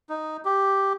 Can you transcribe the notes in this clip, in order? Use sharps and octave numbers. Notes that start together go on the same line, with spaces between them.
D#4
G4